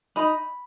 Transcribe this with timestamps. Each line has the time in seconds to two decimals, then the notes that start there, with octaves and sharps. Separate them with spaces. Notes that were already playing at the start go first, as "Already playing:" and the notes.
0.16 D#4 B5